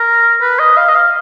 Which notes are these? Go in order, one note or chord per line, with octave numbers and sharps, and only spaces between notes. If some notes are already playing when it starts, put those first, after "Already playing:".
Already playing: A#4
B4
D#5
F5
D#5
F5